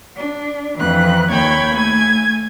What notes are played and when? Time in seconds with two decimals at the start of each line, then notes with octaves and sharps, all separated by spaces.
0.15 D4
0.79 F2 E3 F#6
1.31 D#2 C#5 G5 B5 G#6
1.74 A3 G#5 G#6